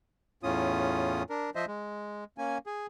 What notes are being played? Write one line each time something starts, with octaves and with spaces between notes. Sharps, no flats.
E2 A2 C#4 F4 D#6
D4 A#4
F3 C5 D#5 E5
G#3
A#3 C#4 G#5
G#4